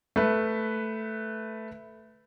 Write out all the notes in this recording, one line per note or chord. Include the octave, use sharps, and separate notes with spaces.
A3 B4